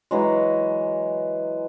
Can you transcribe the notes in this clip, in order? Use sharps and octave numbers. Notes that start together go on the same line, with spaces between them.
E3 F#3 G#3